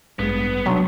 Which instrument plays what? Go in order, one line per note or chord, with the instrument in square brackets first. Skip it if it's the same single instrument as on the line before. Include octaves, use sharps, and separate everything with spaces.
[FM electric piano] A1 G#3 [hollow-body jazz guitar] G2 [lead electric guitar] B3
[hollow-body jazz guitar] B1 D4 [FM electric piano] C3 A#5 C6 [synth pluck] F#3